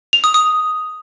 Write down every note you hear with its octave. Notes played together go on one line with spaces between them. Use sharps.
F7
D#6
D#6